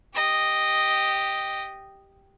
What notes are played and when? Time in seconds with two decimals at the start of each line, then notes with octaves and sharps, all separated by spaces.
0.15 G4 D#5